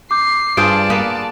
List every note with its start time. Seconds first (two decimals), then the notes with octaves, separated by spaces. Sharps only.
0.11 D6 G6 C7
0.57 G2 F4 G#4 C5 D5 A5 D7
0.90 A#3 B3